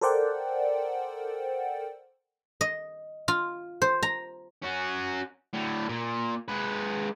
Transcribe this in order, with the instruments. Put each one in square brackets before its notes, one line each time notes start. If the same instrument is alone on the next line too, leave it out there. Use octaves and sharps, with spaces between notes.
[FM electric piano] A4 A#4 C5 D5 F#5 G5
[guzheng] D#5
F4
C5
A#5
[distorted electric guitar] C#4 F#4
A2 D3
A#2
G#3 B4